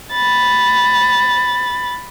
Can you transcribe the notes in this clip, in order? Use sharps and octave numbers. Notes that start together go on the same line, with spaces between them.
B5 A6